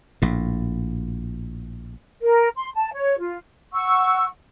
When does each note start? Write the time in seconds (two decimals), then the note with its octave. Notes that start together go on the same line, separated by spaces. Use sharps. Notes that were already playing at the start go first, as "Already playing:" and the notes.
0.22 A#1 A2
2.21 A#4
2.56 C6
2.75 A5
2.92 C#5
3.19 F4
3.73 F#5 C#6 E6